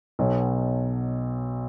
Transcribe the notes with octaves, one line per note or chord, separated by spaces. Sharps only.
B1 B2 F#3